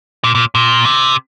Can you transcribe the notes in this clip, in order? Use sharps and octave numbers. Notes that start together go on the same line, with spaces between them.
A#2
A#2
A#2
C3